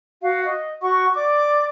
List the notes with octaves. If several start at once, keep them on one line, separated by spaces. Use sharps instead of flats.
F#4 F5
D#5
F#4 F#5 C#6
D5 D6